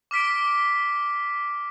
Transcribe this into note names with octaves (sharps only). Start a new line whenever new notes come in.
D6 F6 B6 D7